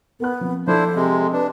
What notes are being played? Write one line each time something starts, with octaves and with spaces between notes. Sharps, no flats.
B3 A#4 F#6
F3 C4
F3 D4 E4 A4 C5
C3 G#3 C4
D4 B4